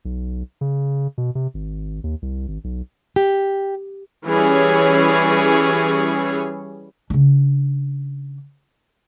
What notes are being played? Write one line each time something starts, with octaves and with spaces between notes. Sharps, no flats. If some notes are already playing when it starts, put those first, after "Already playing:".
B1
C#3
B2
C3
G#1
D#2
C2
G#1
B1
G4
E3 G3 C#4 G#4 C#5
C#3 D4